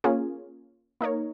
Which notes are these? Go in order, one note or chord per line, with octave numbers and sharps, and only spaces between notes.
A#3 C#4 F4 G#4
A#3 D#4 A#4 C#5